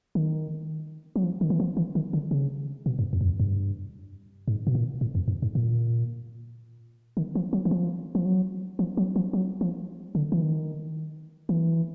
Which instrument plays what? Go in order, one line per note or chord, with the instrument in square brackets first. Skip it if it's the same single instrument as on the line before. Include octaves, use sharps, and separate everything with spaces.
[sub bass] D#3
F#3
F3
D#3
E3
F3
E3
D#3
D3
C#3
B2
G2
F2
F#2
F2
G2
G#2
B2
A#2
A2
F2
F#2
G#2
A#2
D#3
F3
F#3
E3
F3
F3
F#3
F3
F#3
F3
F#3
F3
D3
E3
D#3
E3